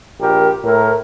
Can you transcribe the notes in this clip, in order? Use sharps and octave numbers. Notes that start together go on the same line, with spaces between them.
A#1 G4 A#4
A2 A#4